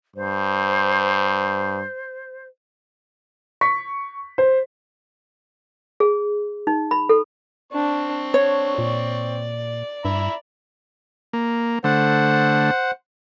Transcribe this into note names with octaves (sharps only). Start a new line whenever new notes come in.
G2 C5
C#6 B6
C5
G#4
D#4
B5
A4
C4 D4 C#6
D4 C#5
A#2 D5
G2 E5 A#5 B5
A#3
D3 A3 C5 F#5